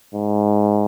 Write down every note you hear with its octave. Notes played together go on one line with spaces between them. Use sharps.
G#2